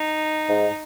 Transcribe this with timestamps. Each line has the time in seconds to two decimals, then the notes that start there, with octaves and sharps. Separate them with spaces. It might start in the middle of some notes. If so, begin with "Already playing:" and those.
Already playing: D#4
0.49 G#2